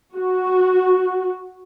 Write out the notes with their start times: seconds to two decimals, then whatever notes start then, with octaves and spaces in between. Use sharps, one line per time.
0.16 F#4